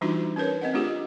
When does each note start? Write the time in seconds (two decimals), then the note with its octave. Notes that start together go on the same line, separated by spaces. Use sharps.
0.01 E3 G3 D4 D#4 F4 F#4
0.36 C#4 G4 A#4 B4 C#5
0.61 C4 D#5 F#5
0.73 A3 D4 F4 G4 G#4